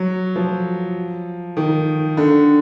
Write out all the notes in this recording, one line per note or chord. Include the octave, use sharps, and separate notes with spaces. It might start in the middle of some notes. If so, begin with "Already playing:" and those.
Already playing: F#3
F3
D#3
D3